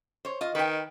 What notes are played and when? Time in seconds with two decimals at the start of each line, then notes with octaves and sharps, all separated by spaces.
0.25 C5 C#5
0.41 F4 D#5
0.55 D#3 B4 G5